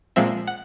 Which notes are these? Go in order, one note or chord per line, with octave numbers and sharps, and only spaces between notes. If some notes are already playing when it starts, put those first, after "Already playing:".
A#2 F3 G#3 C4 E5
F#5